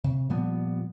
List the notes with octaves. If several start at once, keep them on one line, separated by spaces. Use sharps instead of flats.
C3
A#2 F3 G3 B3